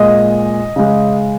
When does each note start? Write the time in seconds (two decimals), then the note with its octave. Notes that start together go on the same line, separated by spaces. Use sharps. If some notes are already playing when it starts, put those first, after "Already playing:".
Already playing: A#2 G#3 D#5
0.76 C#3 G#3